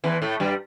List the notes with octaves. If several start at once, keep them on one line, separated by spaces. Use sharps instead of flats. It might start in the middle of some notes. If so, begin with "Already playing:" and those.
E2 E3
A2 A3
G2 G3